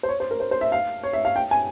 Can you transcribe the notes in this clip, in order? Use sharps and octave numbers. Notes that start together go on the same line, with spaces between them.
C5
C#5
C5
A#4
C5
C5
E5
F5
C#5
E5
F5
G5
G#5